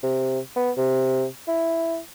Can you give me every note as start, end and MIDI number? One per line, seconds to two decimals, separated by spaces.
0.03 0.39 48
0.56 0.71 59
0.77 1.25 48
1.48 1.98 64